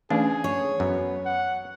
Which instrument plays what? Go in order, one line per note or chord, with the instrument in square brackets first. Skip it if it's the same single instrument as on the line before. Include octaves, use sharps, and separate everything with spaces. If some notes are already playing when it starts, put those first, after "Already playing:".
[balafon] E3 A3 C#4 [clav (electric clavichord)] D4 [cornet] G#4
[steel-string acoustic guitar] C#5
[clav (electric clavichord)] F#2 [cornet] B3
[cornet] F#5